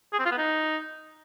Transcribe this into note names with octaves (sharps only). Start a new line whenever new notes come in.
G#4
C4
F4
B3
D#4